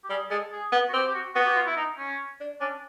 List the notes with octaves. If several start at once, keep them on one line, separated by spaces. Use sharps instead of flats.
G4
G3 G#4
G#3 A4
G#4
B3
F#4
C4 G4
G4
F#4
B3 F#4
G4
F#4
F4
E4
D#4
C#4
D4
C#4 D4